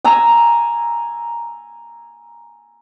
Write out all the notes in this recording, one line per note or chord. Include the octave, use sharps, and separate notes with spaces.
G#5 A#5 E6